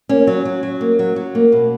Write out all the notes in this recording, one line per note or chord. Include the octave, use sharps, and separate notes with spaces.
A#3 C#4
F#3
F#3
F#3
A#3
F#3
F#3
A#3
B2